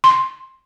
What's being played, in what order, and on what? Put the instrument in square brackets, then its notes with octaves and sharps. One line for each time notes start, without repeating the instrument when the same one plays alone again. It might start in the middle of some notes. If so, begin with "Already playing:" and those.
[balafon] C6